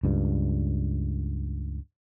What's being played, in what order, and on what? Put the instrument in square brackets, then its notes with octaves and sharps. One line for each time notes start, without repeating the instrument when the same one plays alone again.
[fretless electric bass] C#2 G2